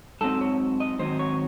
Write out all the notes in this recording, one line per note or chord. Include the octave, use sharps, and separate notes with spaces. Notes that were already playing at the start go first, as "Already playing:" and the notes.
G#2 F#3 C4 D#4 A4
C#5
D#5
G#2 D#3 F#3 C4 C5
C#5